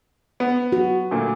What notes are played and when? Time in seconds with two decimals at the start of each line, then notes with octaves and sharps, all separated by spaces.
0.40 B3
0.72 F#4
1.11 D2 A#2